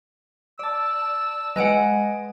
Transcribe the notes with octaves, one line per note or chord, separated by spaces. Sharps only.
D5 A5 E6
G#3 B4 D#5 F#5 G#5 D7